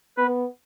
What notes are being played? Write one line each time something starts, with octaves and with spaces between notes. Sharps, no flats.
B3 B4